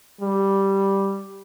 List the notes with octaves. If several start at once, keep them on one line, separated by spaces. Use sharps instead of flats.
G3